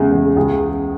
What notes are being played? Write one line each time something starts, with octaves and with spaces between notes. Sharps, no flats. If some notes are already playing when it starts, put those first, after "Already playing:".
Already playing: E2 C#3 G#3
E2
C#2 G#4